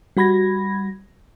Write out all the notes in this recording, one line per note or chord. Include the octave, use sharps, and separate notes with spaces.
G3 F#4 B5 G#6 A#6